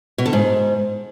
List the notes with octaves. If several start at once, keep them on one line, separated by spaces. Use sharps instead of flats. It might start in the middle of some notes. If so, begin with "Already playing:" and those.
B2
D3
G#2